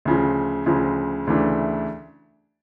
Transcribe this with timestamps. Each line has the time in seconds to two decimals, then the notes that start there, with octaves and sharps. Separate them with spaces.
0.05 D2 C#3 F3
0.66 D2 C#3 F3
1.27 D2 C#3 E3 A3 D4